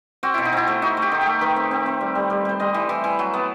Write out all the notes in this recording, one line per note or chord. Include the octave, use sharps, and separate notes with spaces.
C4 F#4
B2 E4
D#4
C4 E4
A3
D#4 F#4
A3
G4
D#3
G4
A3
D#3 B4
C4
C4
C4
G3
G3
G3
G3 C5
G3 D#5
E3
E3
E3
F#3
B3